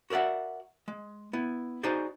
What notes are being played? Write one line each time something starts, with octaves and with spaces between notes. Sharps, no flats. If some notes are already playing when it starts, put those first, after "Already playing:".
F#4 A#4 D5 E5 F#5
G#3
B3 E4
D#4 F#4 G#4 C5 D5